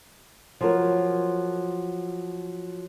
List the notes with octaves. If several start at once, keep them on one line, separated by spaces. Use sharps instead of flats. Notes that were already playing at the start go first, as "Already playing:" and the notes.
F3 F#3 A#4